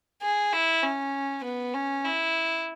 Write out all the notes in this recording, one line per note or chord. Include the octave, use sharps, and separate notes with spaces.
G#4
E4
C#4
B3
C#4
E4